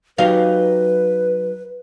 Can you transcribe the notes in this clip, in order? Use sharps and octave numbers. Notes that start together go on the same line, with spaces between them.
F#3 D#4 G4 B4 F5